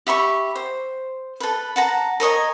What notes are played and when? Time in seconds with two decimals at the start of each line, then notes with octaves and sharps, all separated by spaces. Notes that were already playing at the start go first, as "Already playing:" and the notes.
0.07 G4 E5 B5 C#6
0.56 C5
1.40 A4 B4
1.76 F#5 A5 A#5
2.20 A#4 C#5 D#5 G#5